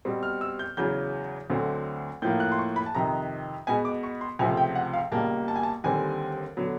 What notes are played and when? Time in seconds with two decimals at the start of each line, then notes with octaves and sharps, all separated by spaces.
0.05 B2 G3 C4
0.23 F6
0.41 E6
0.59 G6
0.77 E2 C#3 F#3 G6
1.50 D2 D3 F#3 A3 C4
2.22 A2 F3 A#3 G6
2.40 F#6
2.52 C6
2.59 C#6
2.76 B5
2.86 A5
2.94 F2 C3 D#3 A#5
3.67 B2 G#3 B3 G#5
3.85 D6
4.03 C#6
4.21 C6
4.39 C#2 C3 F3 A3 C4 G#5
4.57 G5
4.75 F#5
4.93 F5
5.12 C#2 B2 G3 A#3 A5
5.48 A5
5.56 G#5
5.63 A5
5.84 D#2 D3 G3 C4 G#5
6.57 D3 F#3 B3